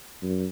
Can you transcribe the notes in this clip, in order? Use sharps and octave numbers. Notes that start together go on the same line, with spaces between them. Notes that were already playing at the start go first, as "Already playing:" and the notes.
F#2